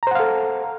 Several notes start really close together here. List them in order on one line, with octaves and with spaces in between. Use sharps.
A#5 C5 F#5 F5 A4